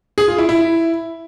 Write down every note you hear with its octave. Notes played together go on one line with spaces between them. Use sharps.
G#4
F4
E4
E4